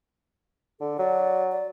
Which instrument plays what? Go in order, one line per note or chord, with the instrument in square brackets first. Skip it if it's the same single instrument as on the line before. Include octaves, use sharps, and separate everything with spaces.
[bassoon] D3 [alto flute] A4
[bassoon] F#3 [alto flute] D5
[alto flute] D5